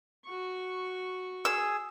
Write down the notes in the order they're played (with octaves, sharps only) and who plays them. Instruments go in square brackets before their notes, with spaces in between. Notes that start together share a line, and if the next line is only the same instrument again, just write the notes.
[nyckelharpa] F#4 C#6
[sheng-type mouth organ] G#4 [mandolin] E6